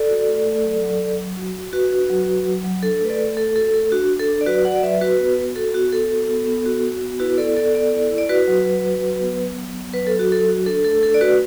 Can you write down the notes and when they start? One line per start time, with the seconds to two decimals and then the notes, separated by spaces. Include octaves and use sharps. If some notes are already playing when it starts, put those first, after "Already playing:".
Already playing: A4 D5
0.09 F#4
0.27 A3
0.45 A3
0.64 F#3
0.82 F#3
1.00 F#3
1.19 F#3
1.37 F#4
1.55 F#4
1.73 F#4 B4
1.91 D4
2.10 F#3
2.28 F#3
2.46 F#3
2.64 F#3
2.83 D4 A4
3.01 A3 B4
3.10 A4 D5
3.19 A3
3.37 A3 A4
3.55 F#4 A4
3.74 A3 A4
3.92 D4 F#4
4.10 D4
4.20 A4
4.29 D4
4.41 D5
4.46 F#3 F#4 B4
4.65 F#4 D5 F#5
4.76 D5
4.83 F#3 B4 E5
5.01 F#4 B4
5.19 B3
5.37 F#4
5.56 F#4 A4
5.74 B3 F#4
5.92 B3 A4
6.11 F#4
6.29 B3
6.47 B3
6.66 F#4
6.84 F#4
7.02 B3
7.20 E4 F#4 B4
7.38 B3 A4 D5
7.57 B3 A4 D5
7.75 B3 A4 D5
7.93 E4
8.11 E4
8.18 D5
8.29 F#4 B4
8.48 F#3
8.66 F#4
8.85 F#4
9.03 F#3
9.20 B3
9.38 B3
9.57 F#3
9.75 B3
9.94 F#3 B4
10.07 A4
10.12 F#3
10.19 F#4
10.30 F#3 A4
10.48 F#4
10.66 D4 A4
10.84 A3 A4
11.03 D4 A4
11.14 D5
11.21 A3 F#4 B4